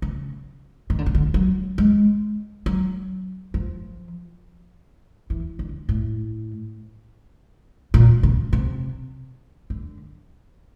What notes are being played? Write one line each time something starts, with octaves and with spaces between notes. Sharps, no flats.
C#3
D#3
D3
C#3
D3
F#3
G#3
F#3
F3
E3
D3
A2
A#2
C#3
C3
D3